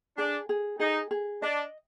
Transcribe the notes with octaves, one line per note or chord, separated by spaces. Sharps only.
D4 G#4
G#4
D#4 G#4
G#4
D4 D#5